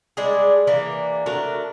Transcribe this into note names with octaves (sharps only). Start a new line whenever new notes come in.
G3 G#3 D4 G#4
E3 A#3 D4
A3 D4 F#4 A#4